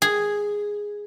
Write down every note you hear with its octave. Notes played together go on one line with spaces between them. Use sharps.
G#4